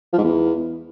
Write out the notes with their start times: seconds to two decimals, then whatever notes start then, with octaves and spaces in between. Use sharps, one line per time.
0.13 F3
0.18 G#2
0.23 E2